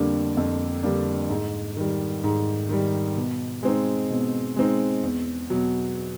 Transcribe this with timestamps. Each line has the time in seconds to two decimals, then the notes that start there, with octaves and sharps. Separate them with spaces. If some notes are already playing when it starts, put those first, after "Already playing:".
Already playing: F2 D3 G3 A#3 D4
0.37 F2
0.83 D3 G3 A#3 D4
1.29 G#2
1.77 D#3 G3
2.24 G#2
2.69 D#3 G3
3.16 B2
3.63 G#3 C4 D#4
4.10 B2
4.56 G#3 C4 D#4
5.03 E2
5.50 B2 F#3